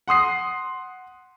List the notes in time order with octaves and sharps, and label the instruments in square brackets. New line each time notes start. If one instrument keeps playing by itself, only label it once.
[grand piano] F#5 C6 D#6 C7